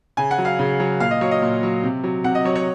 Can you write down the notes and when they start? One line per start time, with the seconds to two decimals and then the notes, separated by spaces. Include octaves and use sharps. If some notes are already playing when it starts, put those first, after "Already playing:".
0.17 C#3 G#5
0.31 F#5
0.38 F#3
0.45 F5
0.59 C#3
0.80 F#3
1.00 A#2 F5
1.11 D#5
1.21 F#3 C#5
1.31 D#5
1.42 A#2
1.63 F#3
1.83 C3
2.04 F#3
2.24 C3 F#5
2.35 D#5
2.45 F#3 C#5
2.56 C#5